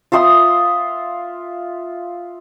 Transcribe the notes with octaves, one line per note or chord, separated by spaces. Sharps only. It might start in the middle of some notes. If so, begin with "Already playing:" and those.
F4 E5 C6 D#6